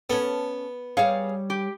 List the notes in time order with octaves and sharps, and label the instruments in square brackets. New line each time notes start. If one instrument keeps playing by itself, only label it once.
[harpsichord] B3 [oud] C#4 A4
[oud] G3 C#5 [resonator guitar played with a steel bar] G#4 F5
[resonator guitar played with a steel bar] G4